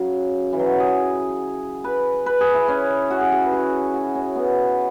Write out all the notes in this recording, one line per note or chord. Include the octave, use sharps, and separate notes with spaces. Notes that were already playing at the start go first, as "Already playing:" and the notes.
Already playing: C#3 F#3
E3
F#3
G#4
B4
B4
G#4
E4
C#4
F#4
G#4
G#4
B4
G#4
F#4
C#4
B3